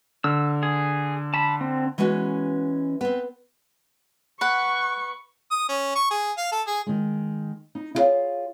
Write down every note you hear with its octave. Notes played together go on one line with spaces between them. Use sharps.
D3 E6 F6
G#4
A5 B5
C4
E3 G#3 B3 C#4 F#4
B3 C4
B4 F#5 C#6
D#6
C#4
C#6
G#4
F5
A4
G#4
D#3 G#3
D#4
E4 F4 G#4 C5 C#5 F5